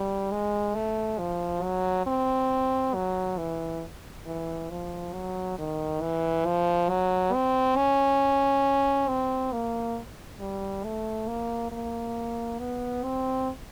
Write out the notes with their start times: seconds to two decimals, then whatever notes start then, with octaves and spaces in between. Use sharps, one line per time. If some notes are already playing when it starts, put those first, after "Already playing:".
Already playing: G3
0.31 G#3
0.75 A3
1.18 F3
1.63 F#3
2.07 C4
2.94 F#3
3.38 E3
4.26 E3
4.70 F3
5.13 F#3
5.58 D#3
6.01 E3
6.46 F3
6.90 F#3
7.33 C4
7.77 C#4
9.08 C4
9.52 A#3
10.40 G3
10.84 A3
11.28 A#3
11.72 A#3
12.59 B3
13.03 C4